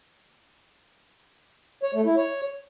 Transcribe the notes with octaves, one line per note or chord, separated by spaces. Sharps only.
C#5
A3
E4
C#5